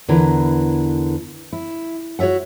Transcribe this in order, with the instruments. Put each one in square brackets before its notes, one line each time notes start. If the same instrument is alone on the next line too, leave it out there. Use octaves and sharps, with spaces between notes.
[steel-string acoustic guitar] E2 D3 E4 A#4 B4 A#5
E4
F#4 C#5 D5 E5 F#5